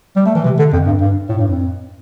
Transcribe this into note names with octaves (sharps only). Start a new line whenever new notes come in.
G3
A3
E3
C3
D3
F2
G2
G2
A2
G2
F2